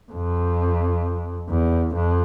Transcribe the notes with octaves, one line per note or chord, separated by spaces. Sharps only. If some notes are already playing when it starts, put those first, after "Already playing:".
F2
E2
F2